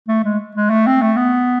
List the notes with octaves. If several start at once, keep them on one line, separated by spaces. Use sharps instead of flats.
A3
G#3
G#3
A3
C4
A3
B3